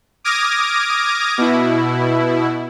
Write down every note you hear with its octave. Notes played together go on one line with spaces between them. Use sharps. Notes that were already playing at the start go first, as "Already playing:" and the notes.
D6 D#6 F6 G#6 A#6 D7
B2 E4